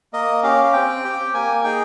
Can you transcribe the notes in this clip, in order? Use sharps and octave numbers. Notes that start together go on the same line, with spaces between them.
A#3 D#5
C#4 G4 F5
F5
C4 G5
G4
A#3 G#5
D#4 G#4 G5